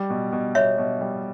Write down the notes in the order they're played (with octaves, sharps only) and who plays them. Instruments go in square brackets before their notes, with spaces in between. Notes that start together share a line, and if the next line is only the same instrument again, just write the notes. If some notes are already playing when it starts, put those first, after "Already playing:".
Already playing: [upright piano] G3
B2
B2
[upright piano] B2 [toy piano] C#5 E5
[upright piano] B2
G3